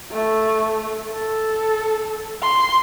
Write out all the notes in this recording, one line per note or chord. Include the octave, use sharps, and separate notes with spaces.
A3
A4
C6